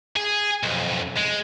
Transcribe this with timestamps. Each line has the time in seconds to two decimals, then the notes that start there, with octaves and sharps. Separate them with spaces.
0.16 G#4
0.63 B1 F2
1.17 G#3